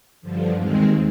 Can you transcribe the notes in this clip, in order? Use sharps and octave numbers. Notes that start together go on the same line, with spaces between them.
G2 D3 F3
D#2 D#3 G#3 C4